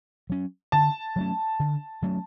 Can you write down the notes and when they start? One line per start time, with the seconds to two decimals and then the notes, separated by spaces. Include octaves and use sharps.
0.30 F#3 C#4
0.72 D3 A5
1.16 F#3 A3 C#4
1.60 D3
2.02 F#3 A3 C#4